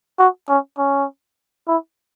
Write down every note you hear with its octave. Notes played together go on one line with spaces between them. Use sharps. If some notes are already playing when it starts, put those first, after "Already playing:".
F#4
C#4
C#4
E4